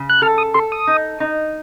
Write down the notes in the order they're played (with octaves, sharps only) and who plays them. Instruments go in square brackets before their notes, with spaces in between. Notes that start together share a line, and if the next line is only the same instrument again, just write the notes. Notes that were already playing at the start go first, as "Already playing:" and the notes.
Already playing: [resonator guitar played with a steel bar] C#3
[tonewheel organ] F#6
[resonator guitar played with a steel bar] A4 [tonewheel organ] F6
[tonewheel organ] D#6
[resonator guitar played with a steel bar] A4 [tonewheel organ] C6
[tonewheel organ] D#6
[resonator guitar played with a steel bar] D#4
D#4